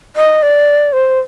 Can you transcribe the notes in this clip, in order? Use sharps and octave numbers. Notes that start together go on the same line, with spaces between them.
D#5
D5
C5